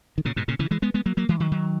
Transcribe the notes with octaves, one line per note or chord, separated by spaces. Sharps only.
D#3
A#2 C#3
G#2 B2
A#2 C#3
C#3 E3
E3 G#3
G#3 B3
G#3 B3
F#3 A#3
F#3 A#3
E3 G#3
D#3 F#3
D#3 F#3